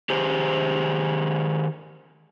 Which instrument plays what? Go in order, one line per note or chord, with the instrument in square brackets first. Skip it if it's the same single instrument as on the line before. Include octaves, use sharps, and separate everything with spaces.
[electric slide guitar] D#3 G4 G#4 C5